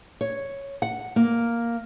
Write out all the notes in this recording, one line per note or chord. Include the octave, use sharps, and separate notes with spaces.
C#5
F#5
A#3